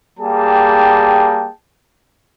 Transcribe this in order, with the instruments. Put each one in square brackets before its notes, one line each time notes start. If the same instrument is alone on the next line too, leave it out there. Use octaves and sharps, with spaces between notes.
[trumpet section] G3 A#3 G#4 G5 A5